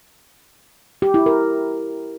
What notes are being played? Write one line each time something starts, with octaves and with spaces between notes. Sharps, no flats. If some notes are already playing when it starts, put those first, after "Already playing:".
G4
E4
A#4